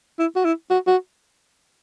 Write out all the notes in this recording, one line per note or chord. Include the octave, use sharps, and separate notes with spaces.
E4
F#4
E4
F#4
F#4